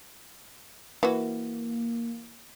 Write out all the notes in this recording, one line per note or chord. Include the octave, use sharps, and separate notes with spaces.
E3 A#3 F#4